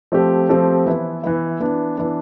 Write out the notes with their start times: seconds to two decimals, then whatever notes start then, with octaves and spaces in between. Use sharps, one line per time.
0.12 F3 A3 C4 G4
0.49 F3 A3 C4 G4
0.86 E3 B3 E4
1.23 E3 B3 E4
1.60 E3 B3 D4
1.98 E3 B3 D4